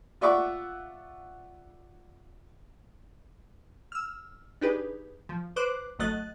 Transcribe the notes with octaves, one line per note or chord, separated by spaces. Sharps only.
F4 D5 E5 F#5 C#6 D6
E6 F6
D4 D#4 G4 G#4 B4
F3
B4 C5 D6 F#6
G#1 F#3 A3 D#5 F#6 A6